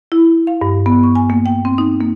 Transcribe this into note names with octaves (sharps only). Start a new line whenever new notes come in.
E4
F5
G2
B3
C#6
G#5
A#3
G5
C4
D#4
A#3